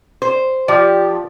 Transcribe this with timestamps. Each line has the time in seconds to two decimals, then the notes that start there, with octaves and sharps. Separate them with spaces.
0.22 C5
0.68 F3 G4 D5